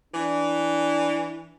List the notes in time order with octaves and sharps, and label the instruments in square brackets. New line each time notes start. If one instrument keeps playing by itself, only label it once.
[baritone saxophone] E3 [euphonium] D4